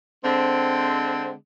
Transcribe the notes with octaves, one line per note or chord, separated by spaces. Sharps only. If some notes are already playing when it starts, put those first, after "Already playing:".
D3 G#3 C4